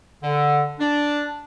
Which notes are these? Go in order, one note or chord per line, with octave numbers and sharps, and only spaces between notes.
D3
D4